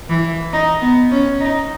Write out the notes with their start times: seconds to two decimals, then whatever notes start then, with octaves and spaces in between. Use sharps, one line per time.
0.09 E3
0.53 D#4
0.82 B3
1.11 C#4
1.40 D#4